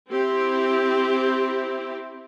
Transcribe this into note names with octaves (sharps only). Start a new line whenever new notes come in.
C4 E4 G4